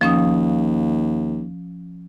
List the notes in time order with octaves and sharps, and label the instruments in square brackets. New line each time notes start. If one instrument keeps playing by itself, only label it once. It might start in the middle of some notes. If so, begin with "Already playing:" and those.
[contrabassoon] D#2 [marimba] F3 C#4 D#6